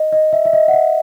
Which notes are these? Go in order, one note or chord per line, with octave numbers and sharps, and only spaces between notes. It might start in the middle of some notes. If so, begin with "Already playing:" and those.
Already playing: D#5
D#5
E5
E5
D#5
F#5
E5